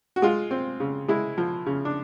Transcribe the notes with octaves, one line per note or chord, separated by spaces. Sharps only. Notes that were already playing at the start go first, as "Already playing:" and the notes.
F#4
G#3 F4
C4
C#3
G#3 E4
F3
C#3
D4